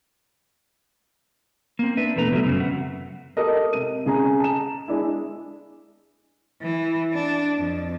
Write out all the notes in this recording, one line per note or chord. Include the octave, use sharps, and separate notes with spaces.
A#3 C4
D4 B4 E5
E2 B2 A3 B4 A#5
C3 D#3 F#3 G3 A3 B3
F#2 C#3 C4
E5 F#5
G4 A4 A#4 D#5
C3 D#7
C#3 G#4 A#5
A5 A#5 E7
G#3 D4 E4
E3
D4
F2